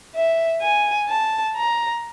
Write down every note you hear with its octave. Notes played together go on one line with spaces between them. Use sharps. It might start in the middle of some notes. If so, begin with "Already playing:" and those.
E5
G#5
A5
A#5